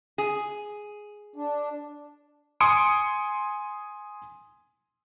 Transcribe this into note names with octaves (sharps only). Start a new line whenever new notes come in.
G#4
D4
G#5 C6 D#6 C#7 D7